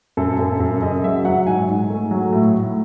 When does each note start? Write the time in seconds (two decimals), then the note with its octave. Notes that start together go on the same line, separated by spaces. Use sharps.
0.17 F#2 A4
0.39 F#2 A4
0.60 F#2 A4
0.82 C#3 D#5
1.04 F#3 E5
1.25 F#3 F#5
1.47 G#2 G#5
1.68 G#2
1.90 A3
2.11 F#3
2.33 A2
2.55 A2